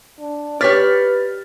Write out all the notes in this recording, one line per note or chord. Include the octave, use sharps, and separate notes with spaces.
D4
G4 B4 C#5 D5 F6 A6 B6